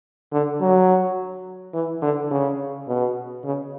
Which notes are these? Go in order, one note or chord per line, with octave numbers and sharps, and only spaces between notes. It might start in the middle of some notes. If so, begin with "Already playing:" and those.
D3
F#3
E3
D3
C#3
B2
C#3